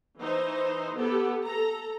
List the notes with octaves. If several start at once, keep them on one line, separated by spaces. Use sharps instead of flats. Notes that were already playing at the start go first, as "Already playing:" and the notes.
E3 D#4 C5
B3 G4 A4
A4 A#5